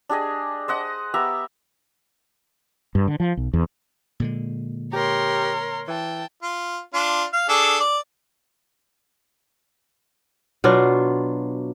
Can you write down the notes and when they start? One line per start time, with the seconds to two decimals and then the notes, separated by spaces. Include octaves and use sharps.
0.09 D4 G4 G#4 D#5
0.68 C5 D#5 F#5
1.14 B3 G4 E5 A#5
2.95 G2
3.08 D3
3.20 F3
3.37 B1
3.53 E2
4.20 A#2 D3 G#3
4.93 G4 A#4 C#5 C6
5.88 E3 G5 A5
6.42 F4
6.94 D4 F4
7.33 F5
7.49 D4 G#4 A4
7.80 D5
10.64 B2 F#3 D4 F4